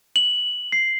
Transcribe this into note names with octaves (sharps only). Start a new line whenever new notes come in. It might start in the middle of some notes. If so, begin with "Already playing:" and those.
F#7
C7